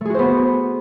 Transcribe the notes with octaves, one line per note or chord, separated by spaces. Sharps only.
A3 B3 F#4 G#4 C5